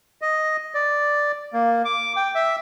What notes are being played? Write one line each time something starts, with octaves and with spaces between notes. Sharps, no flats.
D#5
D5
A#3
D6
G5
E5